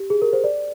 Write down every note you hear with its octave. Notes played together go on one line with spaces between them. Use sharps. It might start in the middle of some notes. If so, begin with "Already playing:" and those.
Already playing: G4
G#4
A#4
C5
D5